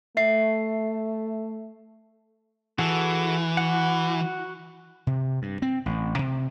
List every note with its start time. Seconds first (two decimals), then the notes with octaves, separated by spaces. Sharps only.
0.17 A3 E5 C7
2.79 E3 F#4 G#4 A4
3.57 F#4 F#5
5.07 C3
5.42 G2
5.62 C4
5.86 A1
6.19 C3